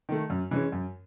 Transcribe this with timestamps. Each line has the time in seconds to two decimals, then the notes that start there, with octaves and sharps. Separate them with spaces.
0.09 D#3 A3
0.30 F#2
0.51 E3 G#3 C#4
0.72 F#2